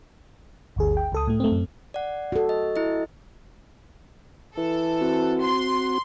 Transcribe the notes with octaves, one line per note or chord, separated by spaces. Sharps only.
G1 D2 G#4
G5
C#2 A4 D#6
A2 A3
A3 C4
F#2
D5 F#5
F#4 A4
D#5
E4 D#5
E3 A4
C4 F#4
C6